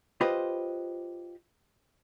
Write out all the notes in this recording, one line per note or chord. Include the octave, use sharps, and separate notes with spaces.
F4 G4 B4 C5 D#5